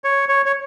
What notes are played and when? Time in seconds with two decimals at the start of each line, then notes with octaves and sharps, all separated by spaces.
0.04 C#5
0.29 C#5
0.46 C#5